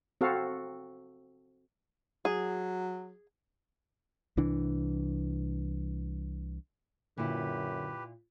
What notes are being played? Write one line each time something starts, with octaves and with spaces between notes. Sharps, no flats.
C4 F#4 A4 F5
F#3 G#4
C2 E3 D4
F#2 A#2 D3 E4 G4 B4